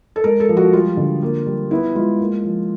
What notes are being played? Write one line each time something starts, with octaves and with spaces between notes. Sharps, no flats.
A4
G#3 A#4
A4
F3
F#4
G3 F4
D3
A#3
G3
B3 E4
G#3 F4
A#3
F3